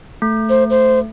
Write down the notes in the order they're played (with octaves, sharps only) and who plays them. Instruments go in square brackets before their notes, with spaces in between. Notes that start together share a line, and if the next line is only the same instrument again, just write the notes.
[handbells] A3
[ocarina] C5
C5